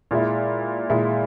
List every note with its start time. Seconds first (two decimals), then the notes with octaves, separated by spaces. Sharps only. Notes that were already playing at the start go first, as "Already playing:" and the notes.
0.11 A#2 G#3 E4
0.90 A#2 G#3 E4